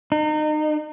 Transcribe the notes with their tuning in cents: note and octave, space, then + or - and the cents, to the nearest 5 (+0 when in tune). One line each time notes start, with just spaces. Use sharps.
D#4 -30